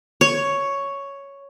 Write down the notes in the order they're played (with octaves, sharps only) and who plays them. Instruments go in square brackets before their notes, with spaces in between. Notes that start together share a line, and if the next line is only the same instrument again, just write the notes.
[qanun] C#5